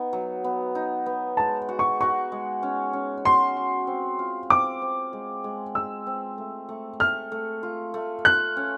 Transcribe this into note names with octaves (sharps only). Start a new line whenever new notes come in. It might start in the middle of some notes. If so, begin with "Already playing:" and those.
Already playing: B3 D#4
F#3
B3
D#4
B3
G#3 A5
F#4
C#6
F#4 C#6
G#3
C#4
C#4
F#4 C6
F#4
C4
F4
C4 D6
C4
G#3
G#3
G#3 E6
C4
A3
A3
A3 F6
A3
F4
A3
F4 F#6
C#4